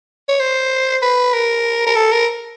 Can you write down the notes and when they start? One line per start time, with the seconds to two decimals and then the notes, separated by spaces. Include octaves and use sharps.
0.28 C#5
0.40 C5
1.03 B4
1.34 A#4
1.87 A#4
1.96 A4
2.12 A#4